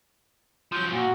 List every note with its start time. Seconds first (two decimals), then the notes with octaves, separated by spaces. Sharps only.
0.72 F3 F#3 G6
0.92 A#2 F#4